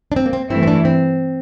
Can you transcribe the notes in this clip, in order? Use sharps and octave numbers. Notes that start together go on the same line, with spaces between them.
D4
C4
A#3
C4
G2 E3 A3 C4 E4
C4
D4
C4